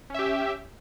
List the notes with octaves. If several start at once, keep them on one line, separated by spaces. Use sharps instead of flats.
C#4 G4 E5